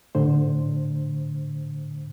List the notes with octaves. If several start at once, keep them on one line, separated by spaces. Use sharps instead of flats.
A2 D3 C5